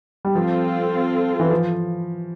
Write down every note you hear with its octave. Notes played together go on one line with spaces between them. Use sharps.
G3
F3 C4 F4 A4
E3
F3